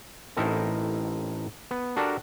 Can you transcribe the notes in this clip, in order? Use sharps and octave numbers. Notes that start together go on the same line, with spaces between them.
A1 C4 D#4 E4 A4 A#4
B3
D4 F#4 G4 A4 A#4 D5